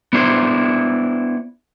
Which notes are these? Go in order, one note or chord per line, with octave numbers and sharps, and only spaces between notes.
B3 D4 E4 C5